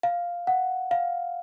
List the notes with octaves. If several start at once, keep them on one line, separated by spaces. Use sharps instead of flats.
F5
F#5
F5